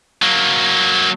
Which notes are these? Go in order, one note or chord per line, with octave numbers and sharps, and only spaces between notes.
F#3 A#3